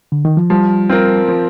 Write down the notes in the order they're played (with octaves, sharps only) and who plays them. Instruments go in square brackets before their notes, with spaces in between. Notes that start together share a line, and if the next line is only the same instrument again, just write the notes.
[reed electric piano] D3
D#3
F3
[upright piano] F3 [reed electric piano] G3
[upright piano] C4 F4 A#4
F3